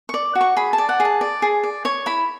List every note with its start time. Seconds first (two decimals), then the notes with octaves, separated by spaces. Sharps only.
0.09 D5 C#6
0.35 F#4
0.41 C#6
0.57 G#4 B5
0.73 A5
0.78 D5
0.89 F#5
1.00 G#4
1.05 A5
1.21 D5
1.42 G#4
1.64 D5
1.85 C#5 C#6
2.06 E4 B5